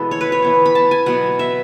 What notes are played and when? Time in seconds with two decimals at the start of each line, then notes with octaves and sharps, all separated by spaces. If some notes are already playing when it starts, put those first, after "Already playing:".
Already playing: B2 E3 G#3 B3 E4 A4
0.11 C#5
0.21 B4
0.32 C#5
0.42 E3 B3 E4
0.66 B5
0.75 A5
0.91 G#5
1.06 B2 F#3 B3 F#5
1.39 E5